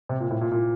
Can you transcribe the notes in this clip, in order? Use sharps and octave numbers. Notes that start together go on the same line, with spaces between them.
C3
A#2
A2
A#2
A#2